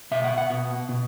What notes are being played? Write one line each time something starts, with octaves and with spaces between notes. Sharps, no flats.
B2 E5
F#5
F#5
B2
B2